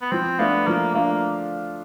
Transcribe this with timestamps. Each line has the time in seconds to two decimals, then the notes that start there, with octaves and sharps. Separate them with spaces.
0.02 B3
0.12 F3 C4
0.39 A3 B3 D4 F4
0.67 F3 A#3
0.95 A3 A#3 D4 F4